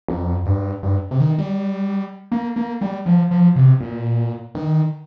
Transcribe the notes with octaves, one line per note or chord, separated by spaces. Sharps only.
F2
G2
G2
C3
D#3
G3
A#3
A#3
G3
F3
F3
C3
A#2
D#3